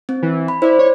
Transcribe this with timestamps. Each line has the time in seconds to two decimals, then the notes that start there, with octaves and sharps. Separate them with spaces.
0.09 C4
0.22 E3
0.48 B5
0.62 E4 C5 D5
0.79 C#5